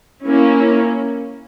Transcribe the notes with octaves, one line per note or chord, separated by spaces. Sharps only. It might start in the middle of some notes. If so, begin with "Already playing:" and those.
A#3 C#4 E4